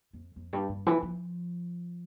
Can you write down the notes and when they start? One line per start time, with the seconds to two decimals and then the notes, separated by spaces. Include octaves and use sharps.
0.13 F2
0.36 F2
0.53 G2
0.69 G2
0.86 E3
1.03 F3